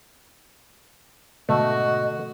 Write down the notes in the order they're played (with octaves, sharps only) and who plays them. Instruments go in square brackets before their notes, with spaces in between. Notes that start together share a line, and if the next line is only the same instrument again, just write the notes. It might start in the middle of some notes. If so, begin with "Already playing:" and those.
[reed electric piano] G#2 B2 D3 [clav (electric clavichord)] A3 [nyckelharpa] F#4 [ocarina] D#5